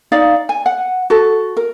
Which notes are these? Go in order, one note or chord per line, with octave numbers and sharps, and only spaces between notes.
D#4 D5 F5
G#5
F#5
F#4 A4
A#4